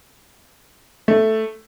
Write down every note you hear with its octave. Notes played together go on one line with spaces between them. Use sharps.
A3